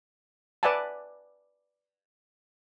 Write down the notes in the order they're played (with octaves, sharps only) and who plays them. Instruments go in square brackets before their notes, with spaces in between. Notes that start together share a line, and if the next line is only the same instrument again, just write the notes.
[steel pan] B4 D5 E5 F#5 G#5 A5